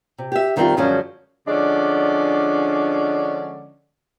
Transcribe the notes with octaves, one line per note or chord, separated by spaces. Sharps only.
C3
G4 E5
F2 D#3 G3 C4 E4 F4
F#2 D3 F3 G#3 C#4 F#4
D3 F3 G#3 C#4 D4 D5